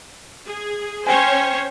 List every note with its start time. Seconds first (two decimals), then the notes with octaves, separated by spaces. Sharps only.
0.46 G#4
1.07 C#4 C5 C#5 G5 G#5